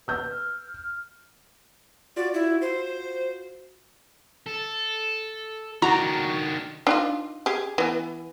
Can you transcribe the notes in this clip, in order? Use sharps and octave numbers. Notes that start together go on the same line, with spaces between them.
B4 E6 G6
F6
F4 F#4 D5
E4
C5
A4
D#3 D4 F#4 A#5
D4 D#4 F4
G4 G#4
E3 B3